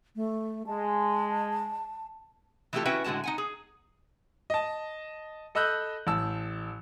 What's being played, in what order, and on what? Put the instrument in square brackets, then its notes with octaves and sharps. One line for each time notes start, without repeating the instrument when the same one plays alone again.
[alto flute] A3
[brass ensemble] G#3 [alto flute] A5
[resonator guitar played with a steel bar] E3 A3 E4 F4 G4 A4
C#4 E4 F#4 B4 E5 G5
A2 D3 G#3 F#4 A5
D#4 F#5 G#5
G#4
[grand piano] D#5 A5
A4 D#5 B5 E6 F#6 G6
A1 A5 E6